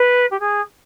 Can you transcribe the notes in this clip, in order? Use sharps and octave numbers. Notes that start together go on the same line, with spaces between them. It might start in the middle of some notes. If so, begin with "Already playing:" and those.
Already playing: B4
G4
G#4